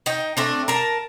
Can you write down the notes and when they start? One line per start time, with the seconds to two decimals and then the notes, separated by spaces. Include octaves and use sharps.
0.06 D#4 G5
0.37 A3 C4 D4
0.68 A#4 A5